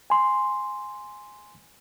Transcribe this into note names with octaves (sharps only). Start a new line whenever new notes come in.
G#5 C6